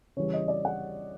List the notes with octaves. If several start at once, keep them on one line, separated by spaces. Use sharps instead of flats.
C#3 E3 G3 C#5
D#5
D5
F#5